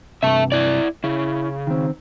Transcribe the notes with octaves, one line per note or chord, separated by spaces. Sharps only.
G2 C3 E5 A5
E4 D5
C#3 E4
D#3 C4